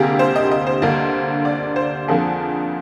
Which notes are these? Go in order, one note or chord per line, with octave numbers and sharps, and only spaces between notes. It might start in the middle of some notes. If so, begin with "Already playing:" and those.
Already playing: D2 C3 G3 A#3 G4 G#4
C5
D#5
D#5
C5
D2 D3 G3 A#3
D5
C5
F2 D3 F3 A#3 G#4